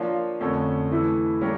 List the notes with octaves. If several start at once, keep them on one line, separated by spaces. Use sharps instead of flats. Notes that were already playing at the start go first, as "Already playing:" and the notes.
Already playing: F3 A#3 D4 F4 C#5
F2 D3 A3 C#4
E3 A3 E4
G3 A#3 C#4 G4 A#4